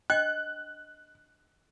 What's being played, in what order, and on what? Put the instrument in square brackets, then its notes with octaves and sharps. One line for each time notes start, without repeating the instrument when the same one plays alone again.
[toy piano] D4 D#5 G5 [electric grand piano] F#6